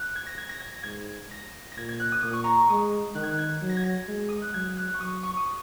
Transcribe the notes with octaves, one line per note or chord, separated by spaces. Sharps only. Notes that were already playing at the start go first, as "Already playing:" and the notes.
Already playing: D#6 F#6
G#6
A#6
G#6
A#6
G#6
A#6
G#2 G#6
A#6
A#6
A#2 G#6
G#6
F#6
D#6
A#2 D#6
C#6
A#5
C#6
G#3 D#6
D#3 F#6
G#6
F#6
G#6
F#3
A#6
G#6
A#6
G#3
D#6
F#6
F#3 G#6
F#6
C#6
F#3 D#6
C#6
D#6